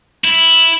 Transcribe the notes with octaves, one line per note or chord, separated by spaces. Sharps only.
E4